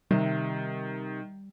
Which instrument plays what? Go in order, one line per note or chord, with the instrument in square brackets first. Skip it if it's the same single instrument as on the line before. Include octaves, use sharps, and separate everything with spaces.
[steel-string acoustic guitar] C3 [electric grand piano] D#3 [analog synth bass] G3